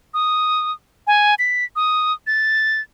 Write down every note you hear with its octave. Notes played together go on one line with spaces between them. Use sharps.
D#6
G#5
B6
D#6
A6